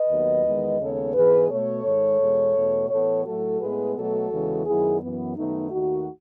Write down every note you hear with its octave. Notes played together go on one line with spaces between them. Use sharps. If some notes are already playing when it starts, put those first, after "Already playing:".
Already playing: B4 D#5
D#2 D#3 F#3 B3
E2 D#3 G#3 B3
D#2 C#3 G#3 B3 A4 C#5
G#2 E3 G#3 B3 G#4 B4
B2 A3 A4 C#5
G#2 D#3 G#3
E2 B2 G#3
E2 B2 A3
A2 E3 B3 A4 C#5
A2 F#3 A3 F#4 A4
A2 G#3 B3 G#4 B4
B2 F#3 A3 F#4 A4
E2 C#3 E3 G#3
F#2 D#3 F#3 B3 E4 G#4
F#2 E3 B3
F#2 D#3 A3 B3 D#4
D#2 D#3 A3 D#4 F#4